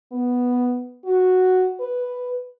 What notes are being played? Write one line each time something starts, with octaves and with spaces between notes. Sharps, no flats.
B3
F#4
B4